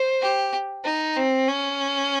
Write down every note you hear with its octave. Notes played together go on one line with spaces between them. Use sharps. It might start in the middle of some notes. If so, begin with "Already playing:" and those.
Already playing: C5
G4
D#4
C4
C#4